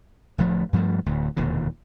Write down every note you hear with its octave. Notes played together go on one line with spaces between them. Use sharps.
D1 D2 F3 A3
G2 F3 G3 A3
D1 D2
E1 D#2 A#2 D3